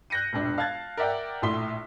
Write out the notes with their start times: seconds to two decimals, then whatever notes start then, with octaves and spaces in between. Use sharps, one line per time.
0.10 F#6 G6 A#6 C#7 D#7
0.33 E1 A#1 D4
0.58 F5 A5 F#6 G#6 A6
0.97 A#4 D5 E5 F#5 G5
1.42 A#1 A2 E5 C6 B6 G7